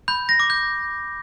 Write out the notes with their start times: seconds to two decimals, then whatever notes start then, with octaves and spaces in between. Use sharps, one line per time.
0.08 B5 G6
0.29 A#6
0.40 D6
0.50 G6